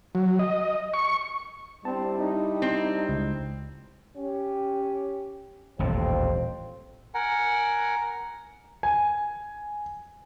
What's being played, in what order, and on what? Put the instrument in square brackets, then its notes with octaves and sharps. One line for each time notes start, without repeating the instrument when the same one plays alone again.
[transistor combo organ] F#3
D#5
C#6
[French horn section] G3 D4 E4 [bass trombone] C4 [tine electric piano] A5
[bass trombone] D#4
[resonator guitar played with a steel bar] C4
[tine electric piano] C#2
[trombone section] C#4 G4
[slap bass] D#1 A1 A#2 [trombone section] F2 C4
[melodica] A#4 F#5 G#5 A#5
[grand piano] G#5